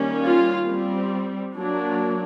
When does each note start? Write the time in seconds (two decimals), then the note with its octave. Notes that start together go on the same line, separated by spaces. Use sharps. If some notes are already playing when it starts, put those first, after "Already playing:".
Already playing: D#3 G3 A#3 C#4
0.23 F4
0.66 G3 C4
1.54 F#3 A#3 D4